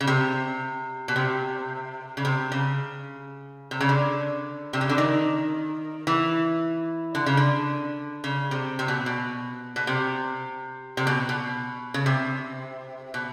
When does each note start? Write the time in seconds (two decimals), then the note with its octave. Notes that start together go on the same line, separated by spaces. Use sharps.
0.01 C#3
0.07 C3
1.08 B2
1.16 C3
2.17 C#3
2.25 C3
2.52 C#3
3.71 C3
3.80 C#3
3.89 D3
4.73 C3
4.81 C#3
4.89 D3
4.98 D#3
6.07 E3
7.15 D3
7.26 C#3
7.37 D3
8.24 C#3
8.51 C3
8.79 C3
8.88 B2
9.06 B2
9.76 B2
9.87 C3
10.97 C3
11.07 B2
11.29 B2
11.94 C#3
12.06 C3
13.14 B2